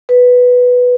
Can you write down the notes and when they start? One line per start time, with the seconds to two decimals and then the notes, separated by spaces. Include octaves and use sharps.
0.09 B4